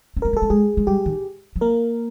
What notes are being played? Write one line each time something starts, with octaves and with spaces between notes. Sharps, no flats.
C4
B3 A#4
A#3
A4
A3
G#3 G#4
G#3
G3 G4
D#3
F#3
A#3 A#4